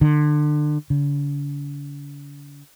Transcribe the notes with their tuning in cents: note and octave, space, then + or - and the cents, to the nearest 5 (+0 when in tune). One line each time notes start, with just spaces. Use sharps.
D3 +30
D3 -45